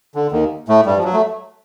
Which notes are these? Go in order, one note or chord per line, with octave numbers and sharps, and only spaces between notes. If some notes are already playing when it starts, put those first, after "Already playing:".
D3
D#2 D#3
A2 A3
G2 G3
F3
F#3
A3